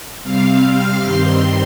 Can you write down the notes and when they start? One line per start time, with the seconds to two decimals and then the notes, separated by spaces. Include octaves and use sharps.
0.22 C3 G3 C4 F5
0.62 F6
1.02 G2 D#3 G3 C4 C6